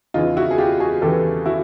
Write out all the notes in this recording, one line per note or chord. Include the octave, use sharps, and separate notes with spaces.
E2 C#3 E3 D#4 F4
E4 F#4
G#4
F4 G4
F#4 G#4
E2 C#3 E3 G4 A4
E4 F#4